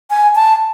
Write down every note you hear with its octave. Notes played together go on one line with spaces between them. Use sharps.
G#5
A5